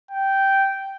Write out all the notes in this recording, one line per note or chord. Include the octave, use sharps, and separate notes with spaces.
G5